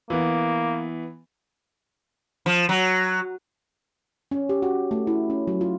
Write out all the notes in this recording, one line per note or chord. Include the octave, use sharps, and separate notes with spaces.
E3 A#3 B3
F3
F#3
C#4
G4
F#4
A3
E4
C#4
F#3
F4